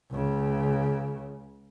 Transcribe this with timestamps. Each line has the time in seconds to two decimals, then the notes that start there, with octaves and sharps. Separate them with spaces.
0.12 C#2 C#3